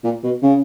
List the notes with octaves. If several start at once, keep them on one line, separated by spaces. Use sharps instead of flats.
A#2
B2
C#3